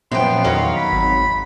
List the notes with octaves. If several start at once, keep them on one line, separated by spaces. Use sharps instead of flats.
F#2 A#2 F3 B3 G5 C6
E2 D#3 F#3 C#5 F5
B5
G#1